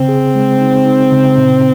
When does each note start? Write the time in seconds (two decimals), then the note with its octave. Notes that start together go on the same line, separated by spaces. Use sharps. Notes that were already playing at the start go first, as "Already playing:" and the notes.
Already playing: C#3 C4
0.09 G#4
0.35 G#3
0.61 D#4
0.86 D#4
1.12 C#3
1.38 A#2